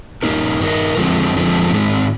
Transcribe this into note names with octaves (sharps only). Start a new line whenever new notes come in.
G2 D#3 A#3 D#4 A#4
G2 D#3 A#3 D#4 A#4
F2 D3 F3 G#3 C4
F2 D3 F3 G#3 C4
G#2 D#3 G#3 C4